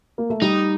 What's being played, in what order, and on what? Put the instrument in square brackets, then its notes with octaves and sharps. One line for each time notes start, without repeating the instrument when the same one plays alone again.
[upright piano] A#3
A3
[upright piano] G3 [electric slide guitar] D#4